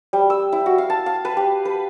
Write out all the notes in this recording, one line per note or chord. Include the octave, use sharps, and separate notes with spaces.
G3
E6
E4
F#4
F5
A5
F5
B4
G4
B4